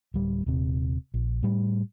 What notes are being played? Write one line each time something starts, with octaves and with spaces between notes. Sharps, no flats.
D1 G3
D#1 C3
A#1
A2 G3